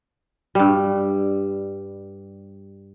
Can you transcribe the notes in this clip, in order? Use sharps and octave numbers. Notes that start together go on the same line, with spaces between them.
G2 G3